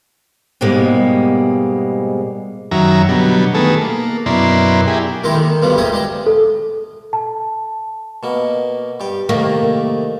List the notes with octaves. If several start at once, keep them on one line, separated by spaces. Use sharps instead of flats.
G#2 B2 G3 G#3 A#3
F#2 D#3 F#3 E5 A#5
B2 D3 F#3 G3
D#3 A3 B3 G#4 A4
A#3
F#2 B2 E4 A#4 D5 C6
E4 G4 G#4
A#2 D#3 G#3 A#3 E4 G4
D3 D#3
G2 B2 D3 F3 G3
D2 A3 D#4 G4 G#4 F5
G#3 D4 G5
A4
A5
B2 A#3
G2 G4
C2 D#3 A3 A#3